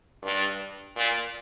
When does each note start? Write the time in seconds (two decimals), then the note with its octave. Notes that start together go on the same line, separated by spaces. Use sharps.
0.23 G2
0.96 A#2